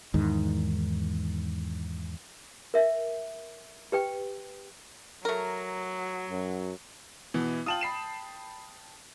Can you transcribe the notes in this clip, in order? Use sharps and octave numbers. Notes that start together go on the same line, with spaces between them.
E2 G#2 D#3
A#4 E5
G4 B4 G5
F#3 A3 A#4
F#2
B2 E3 B3 E4
F4 G5 A5 D#6 E7 F#7
B5 C7 E7